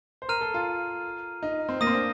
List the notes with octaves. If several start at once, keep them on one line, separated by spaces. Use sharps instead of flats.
C5
A#4 A#5 F6 C7 D#7
A4
F4
D#4
C4
A#3 D#6 A#6 D#7
C4
D4